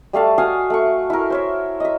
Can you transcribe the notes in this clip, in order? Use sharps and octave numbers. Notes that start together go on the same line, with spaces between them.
G3 A3 F5 A5
F#4 F5 G#5 D#6
A3 C#6
E4 A#4
C5 C#5 E5
D#5 E5